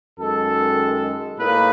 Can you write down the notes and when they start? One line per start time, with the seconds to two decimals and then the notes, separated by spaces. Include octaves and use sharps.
0.19 F#2 D#3 G#3 A4
1.38 A2 F#3 A#3 D#4 B4